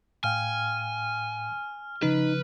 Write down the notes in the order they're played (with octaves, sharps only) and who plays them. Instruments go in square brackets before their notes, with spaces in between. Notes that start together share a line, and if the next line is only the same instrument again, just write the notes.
[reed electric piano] A2 F5 G5 [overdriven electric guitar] G#5 [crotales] F6
[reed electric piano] C#3 F3 [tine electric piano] D#4 [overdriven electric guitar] B4